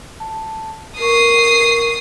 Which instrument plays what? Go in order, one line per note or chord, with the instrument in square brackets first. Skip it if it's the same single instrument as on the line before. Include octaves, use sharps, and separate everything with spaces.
[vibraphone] A5
[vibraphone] A#4 C#6 [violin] D#6 C7